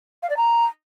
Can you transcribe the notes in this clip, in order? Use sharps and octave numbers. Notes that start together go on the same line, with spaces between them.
F5
D5
A#5